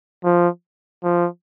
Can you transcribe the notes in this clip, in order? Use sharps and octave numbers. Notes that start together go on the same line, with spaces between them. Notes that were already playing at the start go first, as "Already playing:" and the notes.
F3
F3